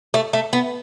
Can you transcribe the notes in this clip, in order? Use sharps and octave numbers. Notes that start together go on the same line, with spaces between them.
A3
A3
B3